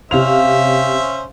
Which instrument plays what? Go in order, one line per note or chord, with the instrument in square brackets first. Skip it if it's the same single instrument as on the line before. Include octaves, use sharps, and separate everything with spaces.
[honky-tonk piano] C3 F7 [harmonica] C#4 C5 E5 [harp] C#5 F5